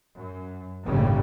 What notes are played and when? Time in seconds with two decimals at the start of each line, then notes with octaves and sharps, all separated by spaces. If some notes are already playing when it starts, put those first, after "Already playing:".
0.16 F#2
0.84 G1 D#2 A2 C#3 G3